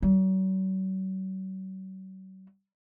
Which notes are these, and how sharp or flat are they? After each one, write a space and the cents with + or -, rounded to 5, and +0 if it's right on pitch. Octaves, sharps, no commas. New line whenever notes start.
F#3 +40